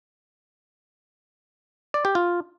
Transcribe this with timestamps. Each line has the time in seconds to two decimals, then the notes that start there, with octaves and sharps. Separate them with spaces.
1.94 D5
2.05 G4
2.15 F4